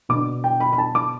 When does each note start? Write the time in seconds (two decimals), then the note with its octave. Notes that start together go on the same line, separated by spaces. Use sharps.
0.09 B2 B3 D4 D6
0.44 G5
0.60 B5
0.72 B5
0.78 A5
0.95 D6